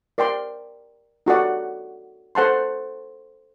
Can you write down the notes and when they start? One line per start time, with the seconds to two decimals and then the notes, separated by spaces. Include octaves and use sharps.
0.18 A#4 D5 G5 C6
1.26 D#4 F#4 A4 D5 F#5
2.35 A4 C5 F#5 A5 C6